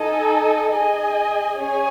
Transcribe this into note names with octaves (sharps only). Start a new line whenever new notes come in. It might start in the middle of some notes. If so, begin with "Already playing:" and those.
Already playing: D#4 A4 D#5 G#5
G#4 D#5 G#5
C#4 G#4 C#5 G#5